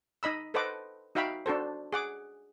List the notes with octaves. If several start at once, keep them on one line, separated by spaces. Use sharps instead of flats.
D#4 D#5 B5 E6
A4 B4 C5 D#5 F#5 D6
D#4 F#4 E5 F5 G5 B5
D4 F#4 A4 C5
G#4 F#5 D6